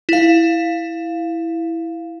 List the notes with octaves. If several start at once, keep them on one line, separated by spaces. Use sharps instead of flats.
E4 F5